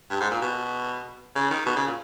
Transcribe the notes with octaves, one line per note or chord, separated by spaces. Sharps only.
G2
G#2
A#2
B2
C#3
D#3
B2
C#3
A#2